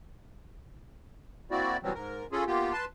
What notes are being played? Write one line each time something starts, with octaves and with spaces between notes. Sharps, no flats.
A#3 C4 E4 F#4 D5
B2 E3 F#3 G3 C4
G#2 A#4
C#4 F4 G#4 A4
A#3 B3 F4 G4
B4 A5 C6